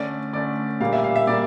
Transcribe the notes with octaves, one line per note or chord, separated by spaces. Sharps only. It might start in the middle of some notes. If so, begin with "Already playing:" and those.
Already playing: D3 A3 C#4 D5
D3 A3 C#4 D5
A#2 G3 A#3 F5
E5
F5
E5
A#2 G3 A#3 D5